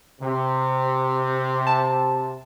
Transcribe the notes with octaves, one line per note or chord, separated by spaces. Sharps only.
C3
A5